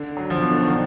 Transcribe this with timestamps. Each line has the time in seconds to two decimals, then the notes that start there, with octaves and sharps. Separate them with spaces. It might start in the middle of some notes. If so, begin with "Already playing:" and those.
Already playing: D3
0.17 F#3
0.30 F3
0.39 B2
0.50 D3
0.61 D#3
0.71 D3